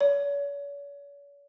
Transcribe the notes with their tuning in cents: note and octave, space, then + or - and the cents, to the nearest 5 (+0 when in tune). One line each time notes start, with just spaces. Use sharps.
C#5 +40